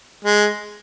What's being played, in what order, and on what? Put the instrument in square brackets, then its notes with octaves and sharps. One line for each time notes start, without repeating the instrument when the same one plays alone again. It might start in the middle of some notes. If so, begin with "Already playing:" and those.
[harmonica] G#3